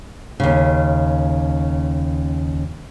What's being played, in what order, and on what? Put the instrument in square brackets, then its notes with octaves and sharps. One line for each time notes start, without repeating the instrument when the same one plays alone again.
[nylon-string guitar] D#2 C#3